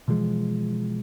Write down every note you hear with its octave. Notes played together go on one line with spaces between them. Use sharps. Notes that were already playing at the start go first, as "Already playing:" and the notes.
B2 E3 F3 G#3